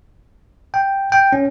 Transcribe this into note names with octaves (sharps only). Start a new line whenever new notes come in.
G5
G5
C#4